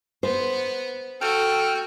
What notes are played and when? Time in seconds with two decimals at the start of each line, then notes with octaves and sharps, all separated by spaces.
0.23 B3 C5
1.21 F#4 A4 G5 F6